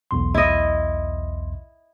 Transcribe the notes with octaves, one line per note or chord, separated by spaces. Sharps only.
B1 E2 C6
E4 D#5